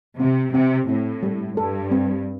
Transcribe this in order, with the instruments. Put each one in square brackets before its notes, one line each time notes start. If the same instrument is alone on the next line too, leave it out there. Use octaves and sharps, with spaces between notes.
[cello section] C3 [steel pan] C4
[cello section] C3 [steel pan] C4
[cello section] A2 [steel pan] C4
[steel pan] G3
[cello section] G2 [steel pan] A4
[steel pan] C4